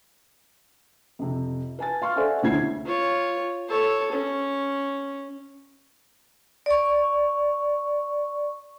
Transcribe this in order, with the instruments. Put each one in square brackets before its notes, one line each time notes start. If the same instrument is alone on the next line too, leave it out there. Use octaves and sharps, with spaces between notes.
[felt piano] F2 C3
B4 G#5 A5 A6
F5 C6 C#6 F6
A4 C5 D5 E5 F#5 G#5
E1 D2 C#4 E4 G#6 C7
[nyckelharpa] F4 C#5
A4 C#5
C#4
[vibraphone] D5 C#6